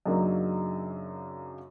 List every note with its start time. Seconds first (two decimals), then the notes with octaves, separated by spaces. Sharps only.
0.06 F#2 C#3 F#3 A#3 D4 D#4